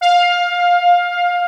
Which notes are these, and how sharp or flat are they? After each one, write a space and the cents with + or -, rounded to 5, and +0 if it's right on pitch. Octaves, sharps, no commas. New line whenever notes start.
F5 +10